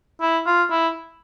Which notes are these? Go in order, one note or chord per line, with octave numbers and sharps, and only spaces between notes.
E4
F4
E4